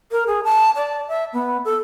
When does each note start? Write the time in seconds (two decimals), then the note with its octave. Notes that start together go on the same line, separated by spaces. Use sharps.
0.12 A#4
0.27 G#4
0.44 A5
0.76 D5
1.08 E5
1.33 B3
1.65 A4